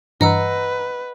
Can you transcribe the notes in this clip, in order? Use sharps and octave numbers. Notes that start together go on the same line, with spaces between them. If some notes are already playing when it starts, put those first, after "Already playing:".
G2 E3 B4 D#5 F#5 A#5 E6